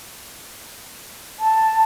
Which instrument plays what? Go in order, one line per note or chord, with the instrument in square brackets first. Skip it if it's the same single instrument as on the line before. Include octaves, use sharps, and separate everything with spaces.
[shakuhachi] A5